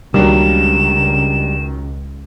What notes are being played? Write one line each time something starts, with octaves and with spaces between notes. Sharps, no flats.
C#2 D#3 F#3 G3 A#3 D4 E7